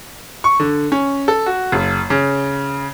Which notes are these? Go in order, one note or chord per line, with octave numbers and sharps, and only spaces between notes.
C#6
D3
C#4
A4
F#4
F#1
C#3